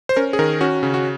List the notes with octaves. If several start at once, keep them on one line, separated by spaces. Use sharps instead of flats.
C5
C#4 A#4
G#4
D#3 A#4
C#4 F#4
C#3
F#4